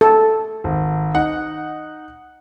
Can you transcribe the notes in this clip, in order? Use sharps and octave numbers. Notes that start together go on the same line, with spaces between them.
A4
G#1
D#4 F#5